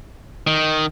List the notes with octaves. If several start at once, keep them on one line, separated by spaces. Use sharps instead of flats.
D#3